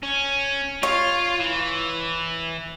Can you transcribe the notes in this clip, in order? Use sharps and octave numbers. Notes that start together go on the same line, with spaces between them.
C#4
F4 C#5
E3